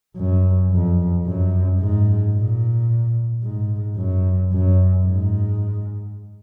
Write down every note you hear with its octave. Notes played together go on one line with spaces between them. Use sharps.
F#2
F2
F#2
G#2
A#2
G#2
F#2
F#2
G#2